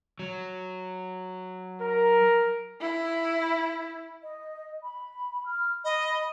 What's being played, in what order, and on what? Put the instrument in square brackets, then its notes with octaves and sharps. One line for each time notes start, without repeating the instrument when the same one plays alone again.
[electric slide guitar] F#3
[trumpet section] A#4
[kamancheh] E4
[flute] D#5
B5
F6
[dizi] D#5 [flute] B5